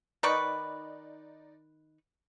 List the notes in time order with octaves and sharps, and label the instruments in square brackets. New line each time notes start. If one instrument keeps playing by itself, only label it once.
[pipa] D#3 B4 C#6 [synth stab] D#4 D5